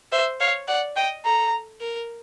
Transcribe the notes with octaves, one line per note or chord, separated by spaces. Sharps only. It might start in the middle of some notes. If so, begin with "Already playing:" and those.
C5 E5
C#5 F5
D5 F#5
D#5 G5
A4 A#5
A#4